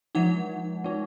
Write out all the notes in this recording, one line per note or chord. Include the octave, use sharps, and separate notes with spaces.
F3 G#3 D#4 F#5
G#3 D#4